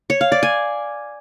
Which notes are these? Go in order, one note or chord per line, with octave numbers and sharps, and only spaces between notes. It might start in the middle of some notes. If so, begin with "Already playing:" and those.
C#5
F5
D5
G#5